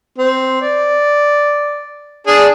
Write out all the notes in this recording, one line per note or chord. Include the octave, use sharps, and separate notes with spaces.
C4
D5
D4 G#4